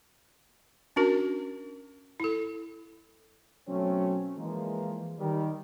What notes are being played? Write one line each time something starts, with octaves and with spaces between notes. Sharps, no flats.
C#4 D4 F#4 A#4
E4 A4
B2 F#3 A3 C4 C#4
E3 F3 G#3 A#3
D#3 G3